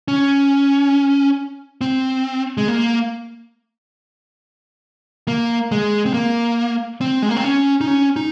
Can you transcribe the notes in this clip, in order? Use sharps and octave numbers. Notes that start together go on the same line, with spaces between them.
C#4
C4
G#3
A#3
A#3
G#3
C4
A#3
C4
G#3
A#3
C4
C#4
D#4
C#4
D#4